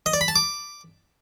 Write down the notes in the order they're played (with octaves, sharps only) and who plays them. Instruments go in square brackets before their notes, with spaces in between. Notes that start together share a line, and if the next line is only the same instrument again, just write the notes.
[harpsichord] D#5
D5
B5
A5
D6